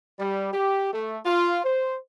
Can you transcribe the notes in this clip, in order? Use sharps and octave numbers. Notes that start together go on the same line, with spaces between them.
G3
G4
A3
F4
C5